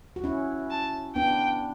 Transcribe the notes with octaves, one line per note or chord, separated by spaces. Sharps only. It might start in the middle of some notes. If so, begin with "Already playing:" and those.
F#4
C#4 E4
A5
B3 D4 G5